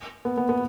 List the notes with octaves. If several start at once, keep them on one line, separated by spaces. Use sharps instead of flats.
B3
B3
B3